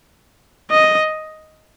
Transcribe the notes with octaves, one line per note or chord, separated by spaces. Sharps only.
D#5